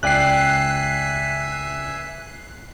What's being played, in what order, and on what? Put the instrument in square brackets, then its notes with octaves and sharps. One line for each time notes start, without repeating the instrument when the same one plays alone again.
[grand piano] C#2 D5 G5 [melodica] E5 G#5 [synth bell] F#6 C7